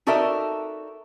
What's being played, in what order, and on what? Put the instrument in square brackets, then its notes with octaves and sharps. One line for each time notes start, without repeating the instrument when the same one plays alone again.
[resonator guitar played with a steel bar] D#4 F#4 A4 A#4 D5 E5